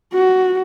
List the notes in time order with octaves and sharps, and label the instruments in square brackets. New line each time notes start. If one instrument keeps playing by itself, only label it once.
[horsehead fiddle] F#4